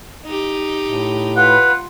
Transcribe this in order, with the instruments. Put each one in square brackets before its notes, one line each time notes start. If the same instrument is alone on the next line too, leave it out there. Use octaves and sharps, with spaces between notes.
[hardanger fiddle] D#4 G4
[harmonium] A2
[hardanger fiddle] F4 [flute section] B4 [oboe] F#5